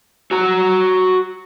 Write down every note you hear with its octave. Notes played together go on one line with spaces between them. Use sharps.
F#4 A#5